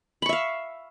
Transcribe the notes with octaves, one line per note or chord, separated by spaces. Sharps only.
E5 F5 B5 C#6